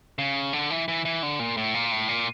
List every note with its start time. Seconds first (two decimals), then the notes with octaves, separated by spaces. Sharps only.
0.18 C#3
0.53 D3
0.70 E3
0.88 E3
1.05 E3
1.23 D3
1.39 A#2
1.57 A2
1.74 A#2
1.92 A2
2.09 A#2